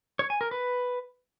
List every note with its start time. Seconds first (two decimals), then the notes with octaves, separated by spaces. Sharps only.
0.19 C#5
0.30 G#5
0.41 A#4
0.51 B4